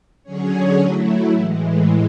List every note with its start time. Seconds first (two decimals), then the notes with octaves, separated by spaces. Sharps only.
0.23 D3 F#3 C#4 G#4 C#5
0.77 F#3 A3 E4
1.32 A2 E3 G#3